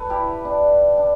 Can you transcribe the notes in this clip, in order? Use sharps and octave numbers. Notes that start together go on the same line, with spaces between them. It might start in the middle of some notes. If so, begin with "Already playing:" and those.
Already playing: A4 B4
E4 G4
D4
D4